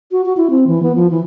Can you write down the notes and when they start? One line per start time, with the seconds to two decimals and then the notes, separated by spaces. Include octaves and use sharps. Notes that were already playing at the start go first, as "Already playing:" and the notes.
0.12 F#4
0.26 F#4
0.37 E4
0.50 C4
0.67 E3
0.83 B3
0.96 F3
1.11 E3